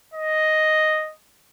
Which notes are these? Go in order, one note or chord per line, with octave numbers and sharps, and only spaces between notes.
D#5